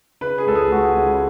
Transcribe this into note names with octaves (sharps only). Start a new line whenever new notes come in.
C#3 B4
G#4
C#2 A4
G#4
C#2 F#4
C#3